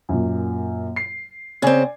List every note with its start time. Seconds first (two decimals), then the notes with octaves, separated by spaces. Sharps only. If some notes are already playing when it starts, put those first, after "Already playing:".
0.09 F#2 A#2
0.96 C7
1.62 C#3 C4 D5 G#5 G#6